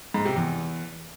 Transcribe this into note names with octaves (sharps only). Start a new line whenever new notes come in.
G#2
C3
E2